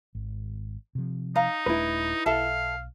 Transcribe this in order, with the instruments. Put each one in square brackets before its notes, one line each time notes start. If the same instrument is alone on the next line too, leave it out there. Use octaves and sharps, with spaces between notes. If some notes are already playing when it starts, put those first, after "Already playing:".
[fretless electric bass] G#1
C3 F3
[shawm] D#4 [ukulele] F5 A#5
[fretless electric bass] D#1 A3 D4 [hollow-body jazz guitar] E4 B4
[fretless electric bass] B1 [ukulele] A4 E5 A5 [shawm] F5